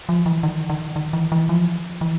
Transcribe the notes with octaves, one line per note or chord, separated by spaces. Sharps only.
F3
E3
D#3
D#3
D#3
E3
E3
F3
E3